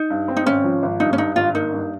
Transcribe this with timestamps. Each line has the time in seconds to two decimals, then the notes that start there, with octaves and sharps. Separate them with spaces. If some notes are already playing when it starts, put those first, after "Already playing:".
Already playing: D#4
0.10 G2
0.28 C4
0.37 D#4
0.46 G#1 C#4
0.64 F3
0.83 G#1
1.00 G2 D#4
1.13 C#4
1.18 G2 D#4
1.36 G#1 F4
1.54 A#3 D#4
1.72 G2